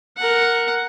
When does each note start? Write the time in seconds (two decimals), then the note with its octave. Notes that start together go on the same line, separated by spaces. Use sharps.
0.17 A#4 F#5